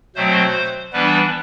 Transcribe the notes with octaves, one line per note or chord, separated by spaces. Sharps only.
B2 F#3 A3 C4 C5
E3 G3 B3 D4 B4